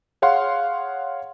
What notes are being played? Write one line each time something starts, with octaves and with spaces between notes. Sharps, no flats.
G#4 C#5 F5 F#5 C6